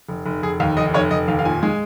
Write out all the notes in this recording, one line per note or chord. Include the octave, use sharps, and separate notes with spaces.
F1
F1
F1 G#4
D#2 F5
F1 D#5
F1 C#5
F1 D#5
D#2 F5
F5
A#2 G#5
G#3